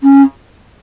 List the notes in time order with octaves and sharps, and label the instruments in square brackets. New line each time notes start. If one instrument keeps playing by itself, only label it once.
[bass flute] C#4